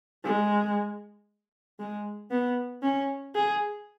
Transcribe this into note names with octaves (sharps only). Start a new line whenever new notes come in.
G#3
G#3
B3
C#4
G#4